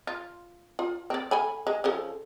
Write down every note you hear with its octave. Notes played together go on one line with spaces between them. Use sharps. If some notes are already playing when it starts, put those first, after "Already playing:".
F4
F4
C4 D5
A4 G#5 B5
G#3
C#3 F3 A4